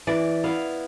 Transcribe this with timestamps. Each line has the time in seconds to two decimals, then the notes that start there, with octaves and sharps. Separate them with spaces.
0.07 E3 D5
0.44 B3 E4 F5